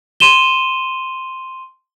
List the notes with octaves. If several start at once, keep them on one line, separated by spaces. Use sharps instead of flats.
C6 D#7 E7 G7